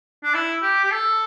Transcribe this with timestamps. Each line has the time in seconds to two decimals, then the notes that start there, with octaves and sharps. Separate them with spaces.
0.24 D4
0.34 E4
0.62 G4
0.84 G4
0.91 A4